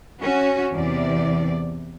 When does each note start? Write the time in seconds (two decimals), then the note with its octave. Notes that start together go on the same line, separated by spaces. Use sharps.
0.22 C#4 F#4
0.74 E2 C3 D5